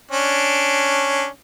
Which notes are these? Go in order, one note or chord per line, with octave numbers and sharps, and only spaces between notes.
C#4 D4